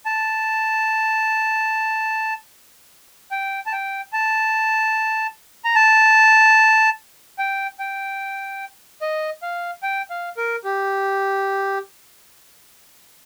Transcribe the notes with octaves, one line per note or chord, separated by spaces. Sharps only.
A5
G5
A5
G5
A5
A#5
A5
G5
G5
D#5
F5
G5
F5
A#4
G4